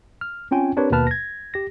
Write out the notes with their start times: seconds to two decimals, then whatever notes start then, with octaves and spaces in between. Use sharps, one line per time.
0.21 F6
0.51 C4 C#4 F4 G5 G#5
0.77 C4 D4 G4 A#4 B4 C#5
0.91 D#2 B2 A#3 B4 A5 F6
1.07 G#6 A#6
1.54 G4 A#6